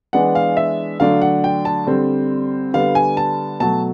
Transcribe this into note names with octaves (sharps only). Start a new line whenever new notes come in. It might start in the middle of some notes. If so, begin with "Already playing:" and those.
E3 G#3 B3 D4 F#5
F5
E5
D3 F#3 A3 D4 F5
F#5
G5
A5
D3 G3 C4
D3 G3 B3 D4 F5
G#5
A5
B2 F#3 A3 A5